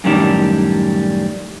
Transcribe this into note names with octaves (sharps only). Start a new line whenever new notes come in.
F#2 A2 D#3 G3 D4